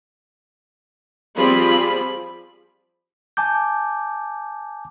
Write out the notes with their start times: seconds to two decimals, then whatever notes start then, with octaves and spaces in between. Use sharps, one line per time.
1.36 F3 G3 C4 F4 G#4 B5
3.37 G#5 A5 D6 G6